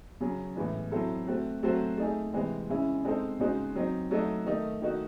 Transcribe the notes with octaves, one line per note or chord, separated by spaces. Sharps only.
C#3 F#3 C#4
A2 E3 G#3
F#3 C4 E4 A4 C5
A3 C4 F#4
F#3 A3 C4 F#4 C5
A3 D#4 G#4
C3 E3 G#3 C4
C#3 G#3 C#4 E4
G#3 C4 D#4 A4 C5
C#3 G#3 D#4 F#4 C5
F#3 C4 D#4
F#3 A3 D#4 F#4 A4
D#3 A3 D#4
D#3 A3 D#4 F#4